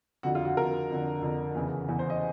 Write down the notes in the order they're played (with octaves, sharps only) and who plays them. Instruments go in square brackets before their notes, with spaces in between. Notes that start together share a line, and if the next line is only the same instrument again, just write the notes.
[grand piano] F2 D3 F#4
F4
F#4
F2 D3 A#4
F2 D3
F2 D3
E2 C#3 E3
E2 C#3 E3
C5
D#5